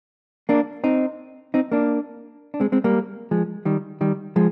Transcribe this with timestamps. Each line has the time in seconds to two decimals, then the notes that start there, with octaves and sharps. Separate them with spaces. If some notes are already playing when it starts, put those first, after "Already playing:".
0.49 A#3 D4
0.84 C4 D#4
1.54 C4 D#4
1.72 A#3 D4
2.54 D4
2.60 G#3 C4
2.72 G#3 C4
2.84 G3 A#3
3.31 F3 G#3
3.65 D#3 G3
4.01 D#3 G3
4.36 F3 G#3